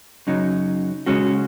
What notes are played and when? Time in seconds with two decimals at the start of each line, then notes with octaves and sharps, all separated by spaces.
0.27 F#2 C#3 F#3 D#4
1.06 C#3 G#3 C#4 F#4